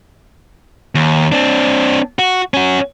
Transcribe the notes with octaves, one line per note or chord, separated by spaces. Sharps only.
D#2
C4 D4
F#4
C#4 F#4